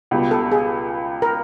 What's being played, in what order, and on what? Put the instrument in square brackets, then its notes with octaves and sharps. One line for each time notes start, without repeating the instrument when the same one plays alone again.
[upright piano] C#2 B2 G3
[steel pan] A4
G#4
A#4